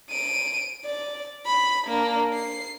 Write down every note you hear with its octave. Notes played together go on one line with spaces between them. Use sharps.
D7 D#7
D5
B5
A#3 D4
C7